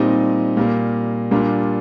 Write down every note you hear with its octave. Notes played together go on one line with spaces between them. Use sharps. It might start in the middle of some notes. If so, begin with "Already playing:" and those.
Already playing: A#2 G3 C4 D#4
A#2 G3 A#3
A#2 G3 A#3 D4 F4